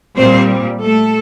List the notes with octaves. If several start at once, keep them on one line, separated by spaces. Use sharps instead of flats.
A#2 G3 C4 C5
A3 A4